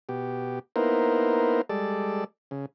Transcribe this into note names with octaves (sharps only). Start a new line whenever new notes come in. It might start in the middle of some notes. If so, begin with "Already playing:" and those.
B2 G4
A#3 B3 D#4 E4 A#4 C5
G3 G#3 A4 D5
C#3